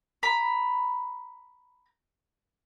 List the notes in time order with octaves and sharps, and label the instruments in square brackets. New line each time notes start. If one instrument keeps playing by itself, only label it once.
[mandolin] A#5 B5